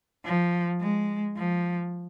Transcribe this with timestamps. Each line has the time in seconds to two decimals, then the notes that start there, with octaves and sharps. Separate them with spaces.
0.25 F3
0.81 G#3
1.36 F3